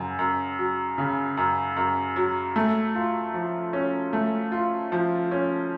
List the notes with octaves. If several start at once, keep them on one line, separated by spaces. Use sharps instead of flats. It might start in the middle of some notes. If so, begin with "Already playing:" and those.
Already playing: F#2 C#3
F#2
F#3
C#3
F#2
F#2
F#3
A3
F4
F3
C#4
A3
F4
F3
C#4